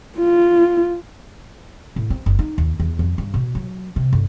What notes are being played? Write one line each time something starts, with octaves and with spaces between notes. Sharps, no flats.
F4
A2
C4
F#1
D#4
D#2
E2
F2
G2
B2
F#3
C3
G1